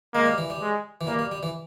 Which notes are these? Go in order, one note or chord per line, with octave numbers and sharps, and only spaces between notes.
G#3 A#3
G3
E3
G3
G#3
E3
G3 A#3
G3
G3
E3